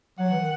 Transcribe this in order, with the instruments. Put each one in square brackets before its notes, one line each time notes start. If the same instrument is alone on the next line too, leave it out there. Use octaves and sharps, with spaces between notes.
[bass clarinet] F#3 [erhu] F#5
[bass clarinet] E3
D#3